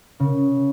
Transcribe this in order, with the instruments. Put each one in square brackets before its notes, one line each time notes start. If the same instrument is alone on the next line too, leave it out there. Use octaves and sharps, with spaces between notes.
[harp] C#3